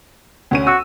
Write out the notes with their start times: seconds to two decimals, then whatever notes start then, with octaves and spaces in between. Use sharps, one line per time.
0.51 D2 C#4 D#7
0.67 F#4 E6